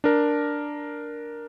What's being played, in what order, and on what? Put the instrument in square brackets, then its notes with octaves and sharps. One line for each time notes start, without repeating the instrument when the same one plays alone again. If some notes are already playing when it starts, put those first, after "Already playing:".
[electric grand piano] D4 A#4